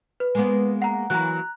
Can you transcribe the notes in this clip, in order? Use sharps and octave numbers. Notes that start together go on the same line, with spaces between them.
B4
G#3 A#3 B3
F#5 A#5
E3 F#3 A#3 A#5 F#6